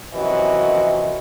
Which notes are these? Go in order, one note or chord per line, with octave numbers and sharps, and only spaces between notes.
F#2 C3 E3 F3 F#4 D#5